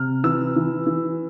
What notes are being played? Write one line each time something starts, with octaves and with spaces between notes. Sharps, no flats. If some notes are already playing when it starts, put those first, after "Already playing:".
Already playing: C3 F6
E3 E6
E3
E3